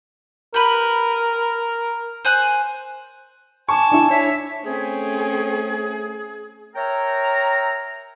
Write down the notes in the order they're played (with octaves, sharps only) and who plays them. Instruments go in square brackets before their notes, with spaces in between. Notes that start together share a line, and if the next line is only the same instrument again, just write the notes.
[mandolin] G4 B4 [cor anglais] A#4
[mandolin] C5 G#5 F#6
[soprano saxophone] G#5 [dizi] A5 [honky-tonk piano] C#6 D6
[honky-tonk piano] D4 E4 [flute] C#6
[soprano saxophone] C#5 [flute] E5
[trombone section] A3 [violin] C4 C#4 [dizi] G#4
[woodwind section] A#4 C#5 E5 G5 A#5